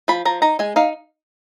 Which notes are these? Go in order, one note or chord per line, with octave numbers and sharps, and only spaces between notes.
F3 B5
F3 A#5
D#4 A#5
G#3 G#5
D#4 F5